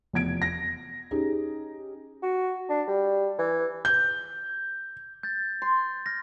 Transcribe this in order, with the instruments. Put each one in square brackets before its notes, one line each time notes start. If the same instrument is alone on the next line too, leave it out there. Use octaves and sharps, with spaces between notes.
[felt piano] F1 E2 G#6 D7
A#6
C#4 D#4 G4 G#4
[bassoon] F#4
D4
G3
E3
[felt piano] G6
[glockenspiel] G6 A6
[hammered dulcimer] C6
[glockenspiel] F6 A#6